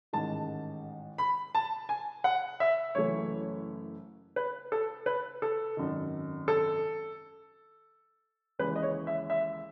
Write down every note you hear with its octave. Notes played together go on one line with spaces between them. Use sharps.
A1 G#2 D#3 A5
B5
A5
G#5
F#5
E5
F#1 F#2 E3 A3 C#5
B4
A4
B4
A4
G#1 F#2 D#3
A4
D#2 C#3 E3 G#3 B4
D#5
C#5
E5
E5